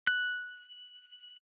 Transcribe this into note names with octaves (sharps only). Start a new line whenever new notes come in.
F#6